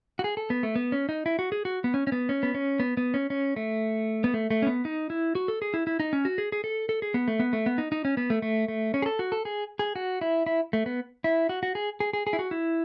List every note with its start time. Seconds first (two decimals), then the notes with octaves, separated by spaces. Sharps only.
0.19 F#4
0.24 G#4
0.37 A4
0.50 B3
0.63 A3
0.76 B3
0.92 C#4
1.09 D#4
1.26 E4
1.39 F#4
1.52 G#4
1.65 F#4
1.84 B3
1.94 C#4
2.07 C#4
2.12 B3
2.29 C#4
2.43 B3
2.55 C#4
2.80 B3
2.97 B3
3.14 C#4
3.30 C#4
3.56 A3
4.24 B3
4.34 A3
4.51 A3
4.62 C#4
4.67 B3
4.85 D#4
5.10 E4
5.35 F#4
5.48 A4
5.62 G#4
5.74 E4
5.87 E4
6.00 D#4
6.13 C#4
6.25 F#4
6.38 G#4
6.52 G#4
6.64 A4
6.89 A4
7.02 G#4
7.14 B3
7.28 A3
7.40 B3
7.53 A3
7.66 B3
7.78 D#4
7.92 D#4
8.05 C#4
8.17 B3
8.30 A3
8.42 A3
8.68 A3
8.94 C#4
9.02 G#4
9.06 A4
9.19 F#4
9.32 A4
9.45 G#4
9.79 G#4
9.96 F#4
10.21 E4
10.46 E4
10.73 A3
10.86 B3
11.24 E4
11.49 F#4
11.63 F#4
11.75 G#4
12.00 G#4
12.13 G#4
12.27 G#4
12.33 E4
12.39 F#4
12.51 E4